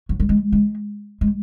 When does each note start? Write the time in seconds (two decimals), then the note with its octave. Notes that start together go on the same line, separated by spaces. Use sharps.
0.09 F#3
0.20 G3
0.29 G#3
0.52 G#3
1.21 G#3